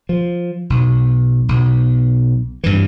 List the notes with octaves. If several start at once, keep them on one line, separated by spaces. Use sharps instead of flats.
F3
B1
B1
G2 E3